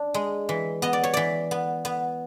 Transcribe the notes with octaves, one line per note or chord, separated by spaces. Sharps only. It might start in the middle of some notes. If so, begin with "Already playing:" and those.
Already playing: D4
G#3
E3
B3 D#5
D5
C#5
E3 D5
B3
B3